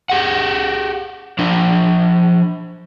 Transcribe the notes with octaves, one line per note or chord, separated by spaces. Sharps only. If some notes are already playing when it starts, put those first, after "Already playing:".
G4 G#4 F#5
F3 D4